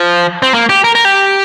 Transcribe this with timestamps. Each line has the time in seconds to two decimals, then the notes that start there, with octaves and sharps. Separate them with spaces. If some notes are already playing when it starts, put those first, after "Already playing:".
Already playing: F3
0.43 C4
0.54 A#3
0.69 G4
0.84 A#4
0.95 A#4
1.05 G4